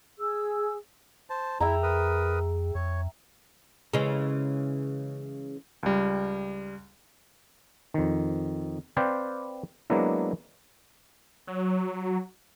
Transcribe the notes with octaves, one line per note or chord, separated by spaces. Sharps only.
G#4 E6
C5 A5
F2 E4 G#4 E5 G5 A#5
A#4 B4 D#6
F2 C#5
C#3 E3 G#3
C#2 G3
F2 D#3
C4 B4 C5 D5 F5 G5
F#3 G#3 A#3 B3 D4 E4
F#3